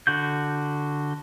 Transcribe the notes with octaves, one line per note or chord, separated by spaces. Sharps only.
D3 F#4 G6